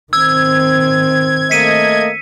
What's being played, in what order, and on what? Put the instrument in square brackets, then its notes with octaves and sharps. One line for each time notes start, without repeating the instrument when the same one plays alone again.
[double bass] D#3 C4 [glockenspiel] E6 [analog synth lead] G#6
[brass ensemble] A3 A#3 D#5 [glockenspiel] B6 C#7 D#7